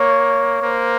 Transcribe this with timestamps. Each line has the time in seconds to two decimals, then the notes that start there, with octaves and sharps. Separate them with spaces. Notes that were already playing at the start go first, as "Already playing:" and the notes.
Already playing: A#3 C#5
0.62 A#3 C5